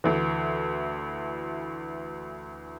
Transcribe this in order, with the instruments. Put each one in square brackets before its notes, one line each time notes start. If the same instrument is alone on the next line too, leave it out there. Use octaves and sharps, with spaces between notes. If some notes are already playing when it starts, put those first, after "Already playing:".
[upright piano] D2 E3